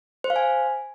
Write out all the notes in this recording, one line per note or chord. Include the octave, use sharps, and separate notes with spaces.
C5
F5
G#5